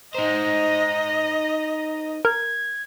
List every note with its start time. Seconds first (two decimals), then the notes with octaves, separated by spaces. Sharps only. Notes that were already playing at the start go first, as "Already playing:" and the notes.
0.15 D#4 C5 D#5 A#5
2.25 A#4 G#6